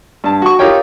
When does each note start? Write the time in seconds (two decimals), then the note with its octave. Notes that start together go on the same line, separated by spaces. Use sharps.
0.24 G2 A5
0.42 F#4 C#6
0.59 D#4 F4 G4 A#4 C#5 G5